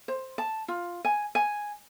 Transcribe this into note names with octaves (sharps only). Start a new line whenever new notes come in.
C5
A5
F4
G#5
G#5